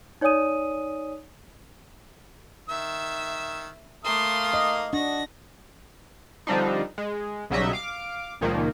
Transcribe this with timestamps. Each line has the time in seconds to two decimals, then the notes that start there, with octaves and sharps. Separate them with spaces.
0.21 D#4 C#5 D5 G#5 D#6 D#7
2.69 D#3 E5 E6
4.04 A3 A#3 F5 C6 D#6
4.54 D#5
4.93 D4 F#4 A#6
6.47 D3 F3 G3 C4 D4 D#4
6.98 G#3
7.50 B1 C#3 F#3 G3 D#5 E5
7.73 F5 D6
8.41 C#2 A#2 D#3 F3 A#3